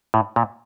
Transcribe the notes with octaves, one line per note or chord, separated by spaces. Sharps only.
A2
A#2